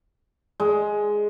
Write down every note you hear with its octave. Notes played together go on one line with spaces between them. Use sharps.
G#3